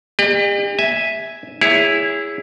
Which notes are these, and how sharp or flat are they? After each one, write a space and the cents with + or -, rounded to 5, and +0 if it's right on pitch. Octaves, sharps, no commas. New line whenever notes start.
G4 +40 D#5 -45
E5 -5 G#5 +0
E4 +0 G#4 -20 C#5 +20